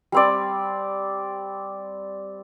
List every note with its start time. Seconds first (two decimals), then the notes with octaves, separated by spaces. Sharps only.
0.12 G3 C4 D5